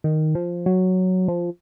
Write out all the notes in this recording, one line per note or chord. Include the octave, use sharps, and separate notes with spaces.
D#3
F3
F#3
F3